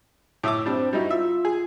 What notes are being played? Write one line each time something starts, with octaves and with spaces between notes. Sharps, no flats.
A2 E5 D6
G3 C4 D4
G3 D#4 E4 F#4
F4 E5
G#4